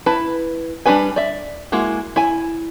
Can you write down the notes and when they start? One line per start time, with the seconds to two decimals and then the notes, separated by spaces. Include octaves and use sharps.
0.06 E4 B4 A5
0.86 G3 D4 A4 B4 G#5
1.16 D5 E5
1.72 G#3 A#3 E4 F#4
2.16 E4 G#5